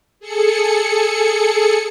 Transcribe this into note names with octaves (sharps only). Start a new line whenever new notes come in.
G#4 A4 C#7